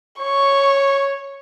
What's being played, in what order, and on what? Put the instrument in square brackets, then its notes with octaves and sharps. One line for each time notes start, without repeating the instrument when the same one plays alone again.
[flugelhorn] C#5 [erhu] C#6